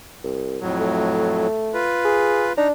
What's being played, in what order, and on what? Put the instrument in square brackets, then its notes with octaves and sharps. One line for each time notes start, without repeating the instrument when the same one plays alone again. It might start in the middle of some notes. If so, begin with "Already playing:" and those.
[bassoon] C2
[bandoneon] F2 A2 F#3
[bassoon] A3
[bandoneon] F4 B4
[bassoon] G#4
[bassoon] D4 [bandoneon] D#4 A#5